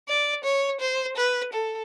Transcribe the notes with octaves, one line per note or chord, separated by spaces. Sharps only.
D5
C#5
C5
B4
A4